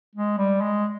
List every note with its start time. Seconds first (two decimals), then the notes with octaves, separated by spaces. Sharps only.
0.16 G#3
0.38 G3
0.61 G#3